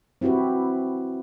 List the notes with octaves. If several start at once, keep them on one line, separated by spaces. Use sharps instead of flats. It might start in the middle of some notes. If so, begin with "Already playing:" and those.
C4 E4 F#4 G4 B4